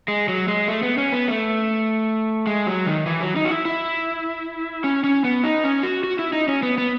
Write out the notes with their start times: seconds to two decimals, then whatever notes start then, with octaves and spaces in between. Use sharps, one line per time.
0.08 G#3
0.28 F#3
0.48 G#3
0.68 A3
0.83 B3
0.98 C#4
1.12 B3
1.28 A3
2.47 G#3
2.66 F#3
2.86 D#3
3.06 E3
3.21 F#3
3.36 D#4
3.45 F#4
3.51 E4
3.65 E4
4.84 C#4
5.04 C#4
5.24 B3
5.44 D#4
5.64 C#4
5.83 F#4
6.04 F#4
6.19 E4
6.33 D#4
6.48 C#4
6.63 B3
6.78 B3